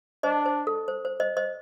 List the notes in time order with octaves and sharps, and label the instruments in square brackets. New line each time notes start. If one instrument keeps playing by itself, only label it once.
[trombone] D4 [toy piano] C5 D#5
[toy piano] C5
A4
C5
C5
C5 D#5
C5 D#5